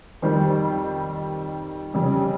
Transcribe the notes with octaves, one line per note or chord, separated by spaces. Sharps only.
F2 D#3 G3 C5
F2 C#3 G3